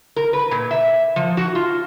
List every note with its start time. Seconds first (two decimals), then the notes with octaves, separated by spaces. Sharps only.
0.16 A#4
0.33 B4
0.51 A#2
0.71 E5
1.16 F3
1.37 F#4
1.55 F4